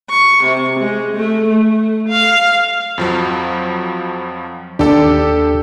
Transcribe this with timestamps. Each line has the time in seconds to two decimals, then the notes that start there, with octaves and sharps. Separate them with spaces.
0.10 C#6
0.44 C3
0.79 G#3
1.15 A3
1.48 A3
2.08 F5
2.98 F2 F3 F#3
4.79 D#2 D4 G4 A4